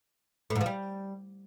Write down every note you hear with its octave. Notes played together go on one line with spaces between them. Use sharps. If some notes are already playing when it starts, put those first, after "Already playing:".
A2
G#2
F3
G3